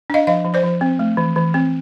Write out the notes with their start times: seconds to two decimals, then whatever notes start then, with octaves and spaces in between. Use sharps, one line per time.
0.10 D4 D#5 F5
0.27 F3 D#5 F5
0.45 F3
0.54 C5 D5
0.63 F3
0.81 C4
0.99 A3
1.17 E3
1.36 E3
1.54 C4